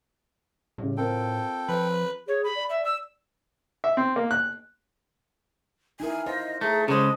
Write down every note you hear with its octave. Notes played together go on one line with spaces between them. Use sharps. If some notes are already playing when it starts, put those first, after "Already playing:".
A2 C#3 G3
C4 F4 A4 A#4 G5
F3 B4
G#4 C#5
B5
D5
E5
E6
E5
C4
A#3
F#6
D#4 E4 A#4 G#5
F4 C5 D#5
A3 G#4 A#5
C#3 G#3 G#4 A4 C5 D#5